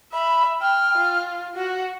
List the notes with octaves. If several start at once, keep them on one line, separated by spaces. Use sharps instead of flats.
E5 B5
G5 F6
F4
F#4 F#5